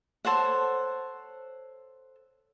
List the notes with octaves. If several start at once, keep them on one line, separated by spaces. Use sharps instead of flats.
A4 C5 C#5 F#5